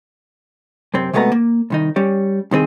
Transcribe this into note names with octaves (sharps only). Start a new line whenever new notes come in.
F#2 C3 C4
C3 G#3 A3 B3 F#4 A#5
A#3
C2 D#3 D#4
G3 C#4
C2 D#3 C4 G#4